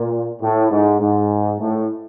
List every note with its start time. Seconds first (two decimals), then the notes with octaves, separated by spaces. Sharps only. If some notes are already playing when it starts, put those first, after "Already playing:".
Already playing: A#2
0.41 A2
0.70 G#2
1.00 G#2
1.60 A2